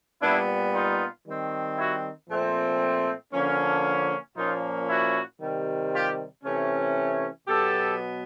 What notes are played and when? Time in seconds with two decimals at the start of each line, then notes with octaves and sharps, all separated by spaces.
0.22 A#2 G3 B3 D4 E4
0.74 D#4 F4
1.26 D#3 G3 C4
1.78 E4 F#4
2.30 A#2 F3 A3 C4
3.33 D3 F3 A#3 C#4
4.36 A#2 F3 A#3 C#4 D#4 F4
4.89 E4 F#4
5.41 C3 D#3 G3
5.92 F4 G4
6.44 C3 E3 A3 C#4
7.48 B2 F#3 B3 G4 A4